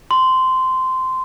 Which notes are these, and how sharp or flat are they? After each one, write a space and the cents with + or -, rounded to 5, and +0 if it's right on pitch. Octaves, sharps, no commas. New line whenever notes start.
C6 -15